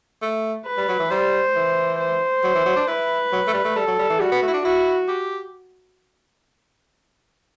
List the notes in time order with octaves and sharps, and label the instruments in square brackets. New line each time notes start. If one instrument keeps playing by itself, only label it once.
[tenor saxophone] A3
[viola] B4
[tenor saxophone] G3
F#3
E3
[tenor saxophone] G3 [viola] C5
[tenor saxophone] E3
[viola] C5
[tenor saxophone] F#3
E3
F#3
D4
[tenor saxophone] E4 [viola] B4
[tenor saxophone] F#3
A3
G3
A3
[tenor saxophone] G3 [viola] A4
[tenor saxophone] F#3
G3
E3
[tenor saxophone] G3 [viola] F#4
[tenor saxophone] B3
A3
E4
D4
[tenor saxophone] E4 [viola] F#4
[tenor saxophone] G4